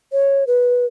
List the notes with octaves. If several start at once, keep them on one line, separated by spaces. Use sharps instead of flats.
C#5
B4